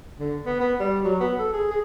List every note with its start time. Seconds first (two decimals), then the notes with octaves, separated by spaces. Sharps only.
0.20 D3
0.46 B3
0.60 B3
0.80 G3
1.05 F#3
1.21 B3
1.39 A4
1.53 G#4
1.71 G#4